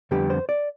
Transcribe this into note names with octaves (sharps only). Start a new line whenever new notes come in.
F2 D3 G3 B3 G4
C5
D5